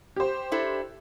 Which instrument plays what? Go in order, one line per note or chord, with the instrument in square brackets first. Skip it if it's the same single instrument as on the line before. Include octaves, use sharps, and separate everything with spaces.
[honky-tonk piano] G4 C5
[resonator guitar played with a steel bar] D4 E4 A4